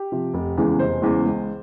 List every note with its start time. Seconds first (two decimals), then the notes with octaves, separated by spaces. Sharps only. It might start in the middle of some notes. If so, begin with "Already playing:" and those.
Already playing: G4
0.12 C3 F3
0.34 F1
0.57 E2 C#3 E3 G#3
0.79 F1 C5
1.02 E2 C#3 E3 G#3
1.25 C#2